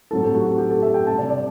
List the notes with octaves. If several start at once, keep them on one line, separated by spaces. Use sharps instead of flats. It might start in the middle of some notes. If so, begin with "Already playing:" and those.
A2 F#3 C4 E4 A4
G4
F#4
F#4
G4
A4
E5
G5
C3 G3 C4 A5
D5
D5